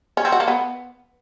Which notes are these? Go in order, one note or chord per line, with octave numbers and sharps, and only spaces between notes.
C#4
C4
F#4
A#3
B3